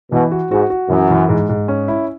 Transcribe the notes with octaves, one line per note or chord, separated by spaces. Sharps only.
B2 E3
F#4
G#2 F#4
F#4
F#2 E3
E3
G#2
G#2
C#4
E4